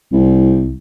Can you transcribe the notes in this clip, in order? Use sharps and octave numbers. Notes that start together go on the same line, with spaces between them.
C2